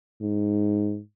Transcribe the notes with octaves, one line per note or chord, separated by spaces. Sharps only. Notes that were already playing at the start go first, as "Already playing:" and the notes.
G#2